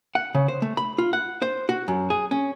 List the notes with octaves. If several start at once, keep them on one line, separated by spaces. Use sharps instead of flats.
F#5
C#3
C5
A3
B5
F4
F#5
C5
F#4
F#2
G#4
C#4